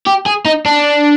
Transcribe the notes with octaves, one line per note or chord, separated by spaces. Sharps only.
G4
G#4
D#4
D4